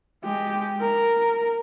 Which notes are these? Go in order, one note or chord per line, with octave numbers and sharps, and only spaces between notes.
G#3 G4
A#4